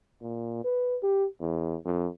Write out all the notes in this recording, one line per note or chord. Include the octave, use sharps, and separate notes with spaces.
A#2
B4
G4
E2
F2